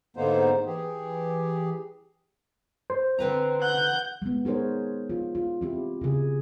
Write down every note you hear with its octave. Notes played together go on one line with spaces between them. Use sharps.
G#2 D3 A#3 B3 D#4 C5
E3 G4 G#4
C5
D3 C4 B4 A#5
F#5 G6
G#3 B3
D#4 G#4 A#4 C5 C#5
F4
F4
C4 E4 G4
C#3 G#4